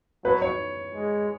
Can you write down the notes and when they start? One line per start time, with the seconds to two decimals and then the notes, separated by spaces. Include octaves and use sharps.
0.24 F#3 B4
0.42 C#5
0.95 G#3